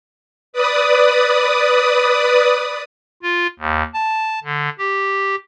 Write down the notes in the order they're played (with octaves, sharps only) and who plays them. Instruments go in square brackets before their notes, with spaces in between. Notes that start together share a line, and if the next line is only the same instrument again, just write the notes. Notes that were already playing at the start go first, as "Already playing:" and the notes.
[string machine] B4 D5 D#6
[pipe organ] F4
D#2
A5
D3
G4